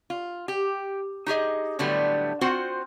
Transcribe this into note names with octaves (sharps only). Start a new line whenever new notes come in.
F4
G4
D#4 G4 G#4 D#5
A2 D3 F#3 G3 A3 B3
C4 F4 F#4 C5 F#5